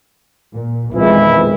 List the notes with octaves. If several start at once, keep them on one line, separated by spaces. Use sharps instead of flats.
A#2
F2 B2 D#3 E3 G#3 E4